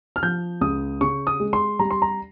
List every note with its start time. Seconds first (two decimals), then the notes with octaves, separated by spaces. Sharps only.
0.16 F6
0.23 F3 G6
0.61 C#2 D#6
1.01 C#3 C#6
1.27 D#6
1.40 G#3
1.53 C6
1.79 G3 A#5
1.91 C6
2.02 A#5